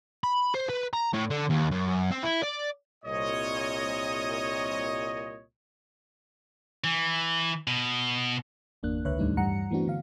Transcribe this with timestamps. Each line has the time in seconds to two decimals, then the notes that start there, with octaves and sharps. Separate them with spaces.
0.24 B5
0.55 C5
0.70 B4
0.94 A#5
1.14 A2
1.30 D3
1.50 D#2
1.71 F#2
2.10 C4
2.23 E4
2.43 D5
3.05 C2 A#2 C#5 D#5
6.84 E3
7.67 B2
8.83 G1 E2 A#3 D4 F#6
9.05 C#2 D3 B4 C#5 E5 F#6
9.19 D#2 A2 G3 A3 D4 D#4
9.37 G2 E3 G3 F#5 A#5 C#7
9.71 E3 A3 B3 C4 D4 F#4
9.87 D3 F5